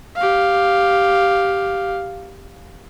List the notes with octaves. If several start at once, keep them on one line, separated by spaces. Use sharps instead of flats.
G4 F5